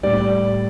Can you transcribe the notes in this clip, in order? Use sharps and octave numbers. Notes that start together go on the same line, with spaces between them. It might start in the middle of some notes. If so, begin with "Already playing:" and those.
A2 G3 D5